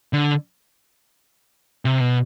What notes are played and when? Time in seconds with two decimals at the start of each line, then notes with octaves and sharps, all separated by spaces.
0.13 D3
1.85 C3
2.00 B2